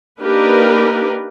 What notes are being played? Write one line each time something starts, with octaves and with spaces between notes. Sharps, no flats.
A#3 D4 D#4 G4 A#4 B4